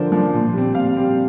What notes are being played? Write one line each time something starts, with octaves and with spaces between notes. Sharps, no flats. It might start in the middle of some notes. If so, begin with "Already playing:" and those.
Already playing: D3 F3 D4 A#4 C5 D5
F3 D4
A#2
G3 C4
A#2 F5
G3 C4